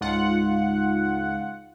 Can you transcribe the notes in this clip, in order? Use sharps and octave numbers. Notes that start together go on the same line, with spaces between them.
C#2 G#2 F4 F#5